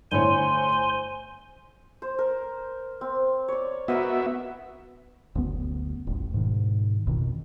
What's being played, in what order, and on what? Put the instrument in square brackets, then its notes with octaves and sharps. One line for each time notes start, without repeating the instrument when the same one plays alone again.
[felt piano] G1 A2 C#5 [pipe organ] C5 G#5 C6
[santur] C5
A#4
C4
C#5 D5
[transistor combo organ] B3 F#4 E5 [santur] A#4 B4 D#5
[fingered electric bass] F#1 D2 B3
D#1 A1
G#2 B2 D#3
A1 F2 B2 D#3